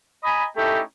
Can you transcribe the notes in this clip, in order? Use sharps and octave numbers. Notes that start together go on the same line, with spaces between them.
D#5 G#5 A#5 B5
A3 C#4 D#4 E4 G4 A4